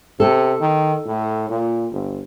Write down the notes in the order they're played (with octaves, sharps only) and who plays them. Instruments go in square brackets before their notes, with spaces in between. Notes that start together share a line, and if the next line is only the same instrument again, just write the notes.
[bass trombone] C3 [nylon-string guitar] A4
[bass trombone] D#3
A2
A#2
G1